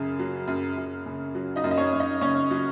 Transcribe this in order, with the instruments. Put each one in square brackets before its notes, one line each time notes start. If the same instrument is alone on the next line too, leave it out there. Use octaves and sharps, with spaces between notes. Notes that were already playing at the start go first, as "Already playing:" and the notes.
Already playing: [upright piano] F#2 C#3 G#4
F#3
F#2
F#2
C#3
F#3
D#4 D#5
F#2
D#5
C#4 C#5
F#2
D#4 D#5
C#3 C#4 C#5
F#3